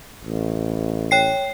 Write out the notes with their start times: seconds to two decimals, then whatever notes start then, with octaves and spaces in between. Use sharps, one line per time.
0.24 A1
1.11 C#5 G5 C7